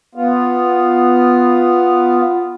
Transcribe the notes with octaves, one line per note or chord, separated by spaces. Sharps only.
B3 F4